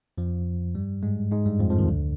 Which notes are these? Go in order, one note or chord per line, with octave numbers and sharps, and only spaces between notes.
F2 F3
G2 G3
G#2 G#3
G#2 G#3
G2 G3
F2 F3
F2 F3
D#2 D#3
D2 D3